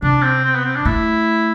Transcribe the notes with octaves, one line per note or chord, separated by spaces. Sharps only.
C3 D4
C4
C4
B3
C4
D4
A3 E4